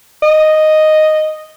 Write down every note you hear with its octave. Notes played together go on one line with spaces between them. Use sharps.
D#5